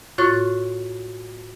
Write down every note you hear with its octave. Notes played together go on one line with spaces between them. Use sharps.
A2 F4 F#4 C#5 C#6 A6